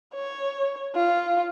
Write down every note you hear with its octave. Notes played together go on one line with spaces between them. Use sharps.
C#5
F4